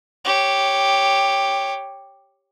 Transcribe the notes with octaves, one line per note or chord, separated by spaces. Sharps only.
G4 C#5